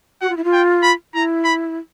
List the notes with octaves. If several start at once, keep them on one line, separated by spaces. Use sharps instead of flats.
F#4 F#5
F4
E4
F4
G5
B5
E4 A#5
B5